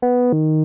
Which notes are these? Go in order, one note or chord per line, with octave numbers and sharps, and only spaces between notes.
B3
D#3